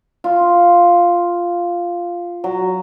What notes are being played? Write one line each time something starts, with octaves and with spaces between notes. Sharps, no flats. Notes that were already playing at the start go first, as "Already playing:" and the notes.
F4
F#3